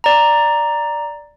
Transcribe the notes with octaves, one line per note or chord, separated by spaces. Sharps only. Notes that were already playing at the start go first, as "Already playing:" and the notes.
D5 A#5